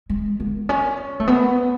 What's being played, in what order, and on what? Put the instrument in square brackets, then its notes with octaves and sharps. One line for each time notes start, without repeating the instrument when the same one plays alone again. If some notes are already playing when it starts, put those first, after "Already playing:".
[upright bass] G#3
B3
C#4
A3
B3